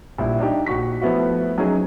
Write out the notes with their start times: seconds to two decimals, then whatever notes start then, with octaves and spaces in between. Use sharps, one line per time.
0.18 A#1 G3 E4
0.39 D4 D#4 G4
0.66 A#1 F#4 C#6 B6
1.01 F3 A3 B3 E4 F#4
1.58 F#3 C#4 D#4 G#4